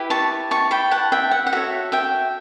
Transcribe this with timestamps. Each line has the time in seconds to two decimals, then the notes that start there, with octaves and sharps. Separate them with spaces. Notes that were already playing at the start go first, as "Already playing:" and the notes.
Already playing: E4 G4 B4
0.10 A5 C#6
0.51 A5 C#6
0.71 G5 B5
0.91 F#5 A5
1.12 E5 G5
1.31 F#5
1.47 F#5
1.52 F#4 A4 C#5 E5
1.92 E5 G5